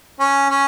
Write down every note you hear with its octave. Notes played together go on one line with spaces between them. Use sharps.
C#4
C#4